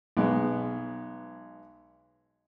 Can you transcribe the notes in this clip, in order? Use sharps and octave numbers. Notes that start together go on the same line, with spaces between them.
B1 G#3 B3